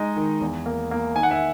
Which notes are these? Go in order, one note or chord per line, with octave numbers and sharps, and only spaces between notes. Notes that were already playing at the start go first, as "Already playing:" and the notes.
Already playing: G#3 D#4 D#5
D#3
E2
A#3
A#3
D#3 G#5
F#5
E5 G#5